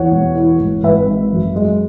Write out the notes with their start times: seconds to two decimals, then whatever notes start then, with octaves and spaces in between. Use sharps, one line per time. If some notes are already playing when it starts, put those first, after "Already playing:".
Already playing: E2 C#5 F#5
0.11 E1
0.36 E3
0.60 G#1
0.84 G#1 B4 E5
1.08 G#2
1.33 F#2
1.56 G#3